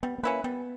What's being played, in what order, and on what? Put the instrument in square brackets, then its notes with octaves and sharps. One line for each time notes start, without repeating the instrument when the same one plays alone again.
[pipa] G3 [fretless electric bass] B3
[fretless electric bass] B3
[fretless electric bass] A#3 [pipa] C#4 E4 B4
[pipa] G3 [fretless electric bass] B3